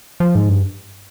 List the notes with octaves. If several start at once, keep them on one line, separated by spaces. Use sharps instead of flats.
F3
G#2
G2